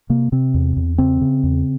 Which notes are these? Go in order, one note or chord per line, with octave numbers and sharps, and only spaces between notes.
C3 A#3
C3 C4
E2
E2
C#3 C4
C#3
E2